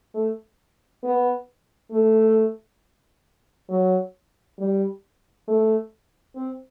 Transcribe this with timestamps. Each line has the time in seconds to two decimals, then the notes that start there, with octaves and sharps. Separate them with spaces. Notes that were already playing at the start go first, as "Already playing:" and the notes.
0.14 A3
1.03 B3
1.92 A3
3.69 F#3
4.58 G3
5.48 A3
6.36 C4